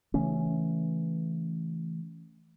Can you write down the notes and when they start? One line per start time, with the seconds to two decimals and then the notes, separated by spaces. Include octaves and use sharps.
0.14 C#3 E3 A3 C#4